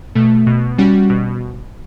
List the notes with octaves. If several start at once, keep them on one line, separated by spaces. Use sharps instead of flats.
B2 A3
B2
G3 C#4 F#4
B2